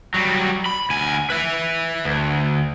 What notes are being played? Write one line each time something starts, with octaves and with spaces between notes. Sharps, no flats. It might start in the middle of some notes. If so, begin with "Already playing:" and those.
F#3 G3
B5
D2 G#5
B4 E5
D2